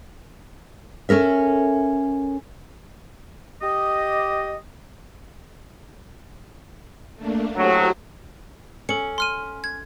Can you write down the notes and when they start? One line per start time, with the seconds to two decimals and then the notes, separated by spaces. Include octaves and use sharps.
1.09 C#4 A4 A#4 E5
3.61 G4 D#5
7.16 A3 A#3 D4
7.57 A2 F#3 F#4 G4 C5
8.89 C#4 A4 C#7
9.18 C6 F6 D#7
9.64 G#6